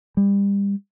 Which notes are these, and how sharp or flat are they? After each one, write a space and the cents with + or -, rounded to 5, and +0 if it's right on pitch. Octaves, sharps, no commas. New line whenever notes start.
G3 +30